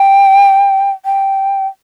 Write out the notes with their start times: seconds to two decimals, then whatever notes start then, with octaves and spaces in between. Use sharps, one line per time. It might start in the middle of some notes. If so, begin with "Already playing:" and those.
Already playing: G5
1.05 G5